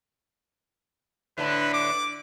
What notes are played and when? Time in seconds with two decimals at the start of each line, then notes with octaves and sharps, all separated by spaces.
1.38 A2 D3 D4 B4
1.73 D6